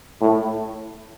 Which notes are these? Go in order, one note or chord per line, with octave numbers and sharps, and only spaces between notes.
A2